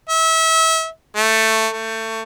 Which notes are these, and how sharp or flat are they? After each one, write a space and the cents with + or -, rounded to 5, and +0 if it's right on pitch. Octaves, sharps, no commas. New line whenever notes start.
E5 -30
A3 +10
A3 +25